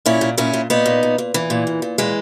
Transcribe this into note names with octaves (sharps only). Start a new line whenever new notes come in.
A#2 C#4 E4
A#2
A#2 C#4 E4
A#2
A#2 B3 D#4
A#2
A#2
A#2
A#2 E3
A#2
A#2
A#2
A#2 E3 G#3